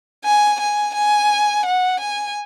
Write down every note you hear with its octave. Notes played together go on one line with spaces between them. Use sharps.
G#5
G#5
G#5
F#5
G#5